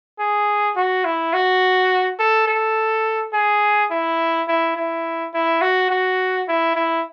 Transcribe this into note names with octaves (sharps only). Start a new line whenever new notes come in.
G#4
F#4
E4
F#4
A4
A4
G#4
E4
E4
E4
E4
F#4
F#4
E4
E4